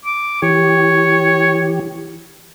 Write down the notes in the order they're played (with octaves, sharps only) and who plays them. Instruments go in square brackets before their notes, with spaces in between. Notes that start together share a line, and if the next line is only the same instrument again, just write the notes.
[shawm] D6
[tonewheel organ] E3 G4 [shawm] C#5